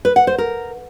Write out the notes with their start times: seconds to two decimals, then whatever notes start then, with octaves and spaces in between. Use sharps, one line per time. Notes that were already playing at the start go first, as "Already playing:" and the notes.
0.05 B4
0.16 F#5
0.27 C5
0.38 A#4